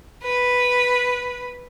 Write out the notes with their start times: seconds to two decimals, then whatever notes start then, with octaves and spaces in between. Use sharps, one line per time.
0.22 B4